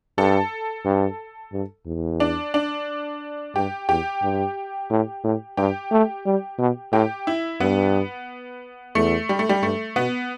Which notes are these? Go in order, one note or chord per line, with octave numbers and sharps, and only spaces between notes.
G2 A4
G2
G2
E2
D4
D4
G2 G4
E2 G4
G2
A2
A2
G2 G4
A3
G3
B2
A2 G4
E4
G2 B3
E2 A3
G3
A3
G3
G2 A3
B2 B3